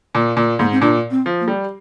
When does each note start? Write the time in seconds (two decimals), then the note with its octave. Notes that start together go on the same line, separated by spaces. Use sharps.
0.15 A#2 A#3
0.36 A#2 A#3
0.59 G#2 A#3
0.72 C4
0.81 A#2 D4
1.11 C4
1.26 F3
1.40 A#3
1.48 G3